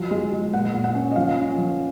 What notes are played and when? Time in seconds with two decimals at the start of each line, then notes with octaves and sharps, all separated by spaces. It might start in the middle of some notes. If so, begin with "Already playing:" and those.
Already playing: F3 F#3 F#5
0.11 G#3
0.32 G#3
0.53 A#2 F#5
0.74 A#2
0.84 F#5
0.95 C#4
1.11 D#5
1.16 F3 F5
1.38 C#4
1.58 F3